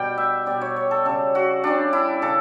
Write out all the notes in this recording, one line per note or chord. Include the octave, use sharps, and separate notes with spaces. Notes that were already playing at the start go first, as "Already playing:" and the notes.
Already playing: B2 G3 G5
E5
B2 G3 D5
C#5
C#5
A4
C#3 G3 A4
F#4
C#3 G3 D4
E4
C#3 A4